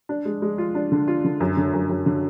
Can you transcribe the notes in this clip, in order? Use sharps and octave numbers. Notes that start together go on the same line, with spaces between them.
D4
G#3
G#3
F4
D4
D3
F4
D3
F#2
D3
F#2
F#2
D3